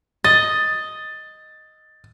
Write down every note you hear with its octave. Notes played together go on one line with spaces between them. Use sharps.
D#5 A6